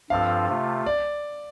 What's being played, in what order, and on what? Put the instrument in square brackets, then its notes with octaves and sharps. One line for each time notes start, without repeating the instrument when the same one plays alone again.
[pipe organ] G2 F3 C4 F4 A4 [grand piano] F5
[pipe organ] C3 A3 F4
[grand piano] D5